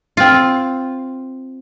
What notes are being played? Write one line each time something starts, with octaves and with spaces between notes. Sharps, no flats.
C4 F4